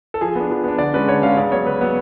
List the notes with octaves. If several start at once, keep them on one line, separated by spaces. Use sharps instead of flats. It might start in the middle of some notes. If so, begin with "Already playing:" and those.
A4
F3 G#4
B3 D4
F3
B3 D4
D3 D5
G#3 C#4 B4
D3 C#5
G#3 C#4 F5
C#3 D5
F#3 B3 C#5
C#3 B4
F#3 B3